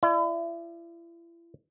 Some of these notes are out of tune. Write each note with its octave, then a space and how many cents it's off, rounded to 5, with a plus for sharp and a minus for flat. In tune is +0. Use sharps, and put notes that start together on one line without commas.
E4 +40 D5 +35